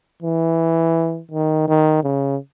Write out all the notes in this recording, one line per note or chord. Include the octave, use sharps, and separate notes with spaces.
E3
D#3
D#3
C#3